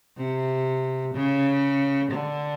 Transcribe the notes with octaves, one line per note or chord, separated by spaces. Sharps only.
C3
C#3
D3